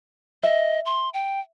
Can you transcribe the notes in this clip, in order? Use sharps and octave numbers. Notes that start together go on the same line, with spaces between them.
D#5 E5
C6
G5